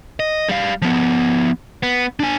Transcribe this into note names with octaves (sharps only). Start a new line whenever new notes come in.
D#5
G3 F5
F3 B3
B3
D4 G#5